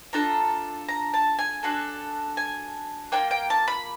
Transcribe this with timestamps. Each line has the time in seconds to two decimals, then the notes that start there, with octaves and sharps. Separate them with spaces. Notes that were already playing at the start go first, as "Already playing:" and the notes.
0.13 D4 F4 A4 A#5
0.88 A#5
1.14 A5
1.39 G#5
1.63 D4 F#4 A4
2.37 G#5
3.12 A#3 D4 F4 G5
3.31 G5
3.50 A5
3.68 B5